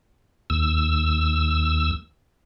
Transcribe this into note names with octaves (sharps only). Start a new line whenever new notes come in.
D#2 E6